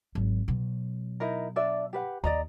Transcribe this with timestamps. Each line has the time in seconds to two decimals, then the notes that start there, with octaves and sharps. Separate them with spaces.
0.15 G#1 F#3
0.48 B2 F#3
1.20 D#4 E4 A#4
1.56 D4 D5 E5
1.93 G4 B4 F#5
2.24 D#2 D5 D#5 A#5